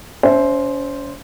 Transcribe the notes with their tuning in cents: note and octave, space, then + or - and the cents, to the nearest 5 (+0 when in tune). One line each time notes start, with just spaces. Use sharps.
C#4 +40 C5 +0 E5 -5